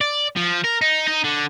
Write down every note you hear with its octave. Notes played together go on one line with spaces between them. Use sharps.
D5
F3
A#4
D#4
D#4
D3